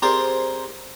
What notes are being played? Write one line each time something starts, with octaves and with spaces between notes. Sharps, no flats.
C4 G4 G#4 A#4 C5 D5